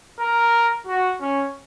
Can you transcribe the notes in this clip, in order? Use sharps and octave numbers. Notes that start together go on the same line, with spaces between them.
A#4
F#4
C#4